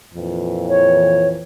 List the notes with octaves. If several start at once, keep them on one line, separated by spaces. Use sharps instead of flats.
F2 A#2 E3
C#5